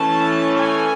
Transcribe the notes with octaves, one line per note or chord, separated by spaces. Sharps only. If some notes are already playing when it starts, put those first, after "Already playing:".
Already playing: E3 A3 C#4 A5
G#5